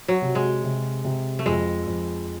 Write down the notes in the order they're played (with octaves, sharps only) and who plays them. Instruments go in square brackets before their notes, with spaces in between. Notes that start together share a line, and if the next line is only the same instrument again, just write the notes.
[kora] F#3
[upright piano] C3
[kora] G#3
[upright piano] C3
C3
[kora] A3
[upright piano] F2 [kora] G#3
[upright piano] F2